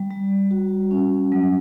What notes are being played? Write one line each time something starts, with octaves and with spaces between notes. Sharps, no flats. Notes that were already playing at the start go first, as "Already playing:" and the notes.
Already playing: G3
G3
F#4
C#4
F#3